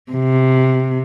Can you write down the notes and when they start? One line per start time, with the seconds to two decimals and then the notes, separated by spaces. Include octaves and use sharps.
0.12 C3